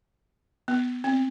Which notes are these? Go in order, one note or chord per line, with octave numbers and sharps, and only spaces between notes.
B3
C4